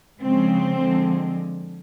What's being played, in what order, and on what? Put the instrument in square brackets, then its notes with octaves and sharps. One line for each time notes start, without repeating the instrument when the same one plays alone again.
[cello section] C#3 F3 G#3 C4
D3 F3 G#3